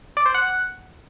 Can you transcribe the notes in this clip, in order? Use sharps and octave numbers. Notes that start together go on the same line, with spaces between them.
D5
C5
F#5